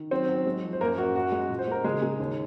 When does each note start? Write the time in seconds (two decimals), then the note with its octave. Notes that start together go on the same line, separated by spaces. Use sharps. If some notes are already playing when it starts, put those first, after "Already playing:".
Already playing: D#3
0.11 F#3 C4 C5
0.29 F#3
0.46 G#3
0.64 F3
0.73 C5
0.81 F#2 A#3 A#4
0.98 F#2 F#4
1.15 F#2 F#4
1.32 G#3
1.49 A#2
1.59 C5
1.67 G#3 A#4
1.84 C#3 G#3 G#4
2.02 G#3
2.20 D#2